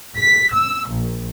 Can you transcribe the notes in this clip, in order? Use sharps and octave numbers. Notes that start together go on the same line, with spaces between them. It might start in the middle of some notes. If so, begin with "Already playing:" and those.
B6
E6
A#1